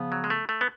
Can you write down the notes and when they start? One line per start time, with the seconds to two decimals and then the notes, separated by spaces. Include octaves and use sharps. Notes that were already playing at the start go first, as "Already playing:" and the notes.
Already playing: C#3 F3 B3
0.12 F#3
0.24 G#3
0.30 A3
0.49 A3
0.61 B3